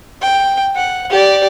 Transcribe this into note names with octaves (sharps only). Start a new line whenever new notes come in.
G5
F#5
G4 D5